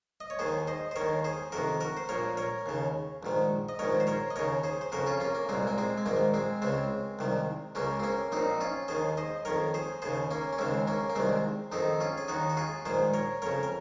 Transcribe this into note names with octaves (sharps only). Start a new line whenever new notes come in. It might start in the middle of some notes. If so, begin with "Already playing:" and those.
D#5
C#5
D#2 D#3 G#4 C5
C5 D#5
C5
D#2 D#3 A#4 C#5
G#4 C5
F2 C3 D#3 F#4 A#4
F#4 A#4
C5
A#1 A#2 A#4 C#5
A#4 C#5
D#2 C#3
A#1 G#2 D#3
D#5
A#1 G#2 D#3 A#4 C#5
C5
A#4 C#5
D#5
D#2 C#3 A#4 C#5
G#4 C5
C5
F2 C#3 F#4 A#4
C#4 F4
A#3 C#4
A#3
C2 A#2 G#3 C4
A#3
G#3 C4
G#3
A#1 G#2 D#3 A#3
G#3 C4
C#2 C#3 G#3 C4
C2 C3 D#3
C#2 C#3 A#3 C#4
C4
A#3 C#4
A#1 A#2 C4 D#4
C#4 F4
D#2 D#3 G#4 C5
C5 D#5
F2 D#3 A#4 C#5
G#4 C5
D#2 C#3 G#4 C5
A#3 C#4
C#4
D#2 C#3 G#3 C4
A#3 C#4
A#3
C2 C3 D#3 G#3 C4
F2 D#3 C4 D#4
C#4 F4
G#4
D#2 D#3 D#4 F#4
F#4
F4 G#4
A#1 G#2 D#3 G#4 C5
A#4 C#5
F2 C#3 A#4 C#5
A#4